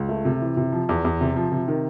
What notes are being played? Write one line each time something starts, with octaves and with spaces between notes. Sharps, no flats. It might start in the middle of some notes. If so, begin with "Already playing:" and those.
Already playing: C#2
A3
C3
E3
C3
F3
E2
E2
C3
F3
C3
D#3